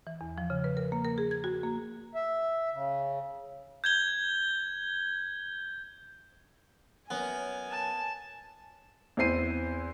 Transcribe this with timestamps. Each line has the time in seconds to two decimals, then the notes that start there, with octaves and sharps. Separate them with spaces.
0.07 E3
0.21 E2
0.38 F3
0.50 C#3
0.64 B4
0.77 A#4
0.92 A#3
1.05 A#4
1.18 G#4
1.31 G#6
1.44 F#4
1.63 A#3
2.15 E5
2.73 C#3
3.84 G6 G#6 G7
7.10 F#2 B3 A#4 C#5 G#5
7.71 A5
9.17 E2 C4 E4 C5 C7 D#7